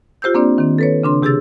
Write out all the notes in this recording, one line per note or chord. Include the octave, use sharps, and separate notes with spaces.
F4 G4 C5 E6 G6
A#3 C4 D4 D5
D#3 C4
A4 B4 C#5
C#3 D4 C6
C3 G4 G#4 E6 A6